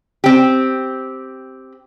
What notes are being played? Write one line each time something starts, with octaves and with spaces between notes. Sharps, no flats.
C4 G4